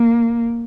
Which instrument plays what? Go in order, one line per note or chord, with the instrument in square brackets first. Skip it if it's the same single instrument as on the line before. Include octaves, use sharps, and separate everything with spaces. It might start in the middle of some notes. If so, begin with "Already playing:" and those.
Already playing: [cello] A#3